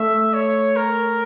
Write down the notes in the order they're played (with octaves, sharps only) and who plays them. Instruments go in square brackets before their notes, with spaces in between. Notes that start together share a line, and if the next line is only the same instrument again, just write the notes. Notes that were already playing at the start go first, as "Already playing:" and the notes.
Already playing: [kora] A3 [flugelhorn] E5
[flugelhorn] C#5
A#4